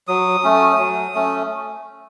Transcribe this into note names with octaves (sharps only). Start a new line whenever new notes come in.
F#3 D#6
A3 C#4
F#3
A3 C#4